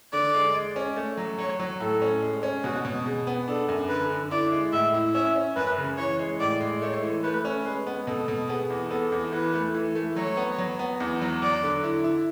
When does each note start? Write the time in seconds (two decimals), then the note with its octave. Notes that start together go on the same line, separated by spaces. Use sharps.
0.13 D3 D5
0.34 G#3
0.54 G#3
0.76 C#4
0.96 A3
1.17 F#3
1.38 F#3 C#5
1.60 F#3
1.80 A2 A4
2.02 C#4
2.22 G#3
2.43 C#4
2.64 B2 F#4
2.85 B2
3.06 B2 G#4
3.27 B3
3.48 D4 A4
3.69 F#2
3.89 D3 B4
4.10 D3
4.31 E4 D5
4.52 G#3
4.72 A2 E5
4.94 E4
5.14 C#4 E5
5.36 C#4
5.56 F#2 B4
5.77 C#3
5.98 E3 C#5
6.19 G#3
6.40 A2 D5
6.61 G#3
6.82 A3 C#5
7.03 E3
7.24 A3 B4
7.45 C#4
7.65 G#3 B4
7.87 B3
8.07 B2 A4
8.28 B2
8.49 B3 G#4
8.70 E2
8.90 B3 A4
9.12 E2
9.33 E3 B4
9.54 A3
9.75 E3
9.95 A3
10.16 F#3 C#5
10.37 B3
10.58 F#3
10.79 B3
11.00 E2
11.21 F#3
11.42 F#3 D5
11.63 D3
11.84 E4
12.04 E4